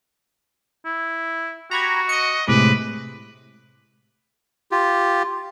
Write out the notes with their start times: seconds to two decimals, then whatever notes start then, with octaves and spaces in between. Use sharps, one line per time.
0.85 E4
1.71 F#4 G4 A#5 B5 G#6
2.09 D#5 C#7
2.48 A2 C3 G#3 B4 D6
4.72 F4 G4